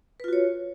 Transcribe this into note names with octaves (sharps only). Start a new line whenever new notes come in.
F4 F#4 B4 C#5